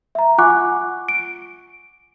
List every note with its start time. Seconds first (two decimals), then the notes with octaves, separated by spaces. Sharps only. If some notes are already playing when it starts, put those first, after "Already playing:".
0.15 E5 A#5
0.38 F4 F#5 G#5 C#6 D6 F#6
1.09 D7